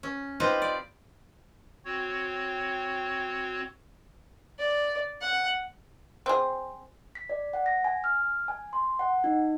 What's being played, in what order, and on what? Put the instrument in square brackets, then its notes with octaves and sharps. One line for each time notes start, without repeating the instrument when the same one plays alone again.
[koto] C#4
C4 D#4 F4 G4 B4 C5
D5
[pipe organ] C4 F#4 C#5
[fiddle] D5
F#5
[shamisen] C4 G#4
[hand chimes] B6
D5
F#5
A#6
G#5
F6
G#5
C6
F#5
D#4